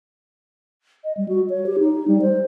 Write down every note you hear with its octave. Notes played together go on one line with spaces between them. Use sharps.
D#5
G3
F#4
C#5
G4
D#4
G3
C5